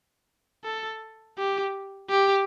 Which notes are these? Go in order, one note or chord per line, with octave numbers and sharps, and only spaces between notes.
A4
G4
G4